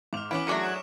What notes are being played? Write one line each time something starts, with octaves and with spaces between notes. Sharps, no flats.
G#2 D6 F6 F7
E3 B3 C#4 D6 B6 D7 F#7
F#3 A3 D4 F#4 G#4 A#4
E7